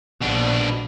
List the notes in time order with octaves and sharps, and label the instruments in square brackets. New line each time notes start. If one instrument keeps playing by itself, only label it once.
[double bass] A#1 [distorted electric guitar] B2 D4